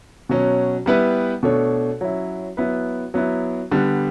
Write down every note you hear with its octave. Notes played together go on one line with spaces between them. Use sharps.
B2 F#3 C#4
G3 B3 E4 B4
B2 A3 D4 A4 C#5
F#3 C#4 E4
F#3 B3 E4 B4
F#3 B3 E4
D3 G3 B3